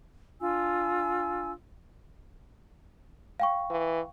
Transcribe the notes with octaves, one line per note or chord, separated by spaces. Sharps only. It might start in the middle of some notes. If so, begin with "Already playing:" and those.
D4 F4 G#5 E6
F5 G5 C#6
E3